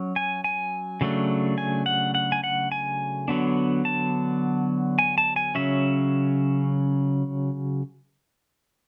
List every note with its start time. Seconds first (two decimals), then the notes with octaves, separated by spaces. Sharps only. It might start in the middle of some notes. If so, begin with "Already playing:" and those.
Already playing: F#3 C#4
0.16 G#5
0.44 G#5
1.01 C#3 F#3 A3 D4
1.58 G#5
1.86 F#5
2.15 F#5
2.32 G#5
2.44 F#5
2.72 G#5
3.28 D3 F#3 B3 D4
3.85 A5
4.99 G#5
5.18 A5
5.36 G#5
5.55 C#3 F#3 C#4 E5